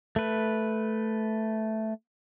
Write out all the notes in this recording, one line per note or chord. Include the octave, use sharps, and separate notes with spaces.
A3 B4